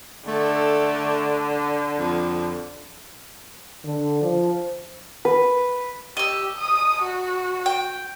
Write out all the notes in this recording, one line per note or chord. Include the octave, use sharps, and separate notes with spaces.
D3 A3
F2
D3
F3
B4
G4 D#5 E6
D#6
F#4
G5